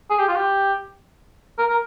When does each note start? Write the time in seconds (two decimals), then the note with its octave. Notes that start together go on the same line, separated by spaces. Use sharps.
0.10 G#4
0.19 G4
0.28 F4
0.36 G4
1.58 A#4
1.70 A#4